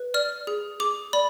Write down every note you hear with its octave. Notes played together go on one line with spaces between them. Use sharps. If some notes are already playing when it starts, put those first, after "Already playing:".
Already playing: B4
D5 F6
G#4
G#4 D6
D5 B5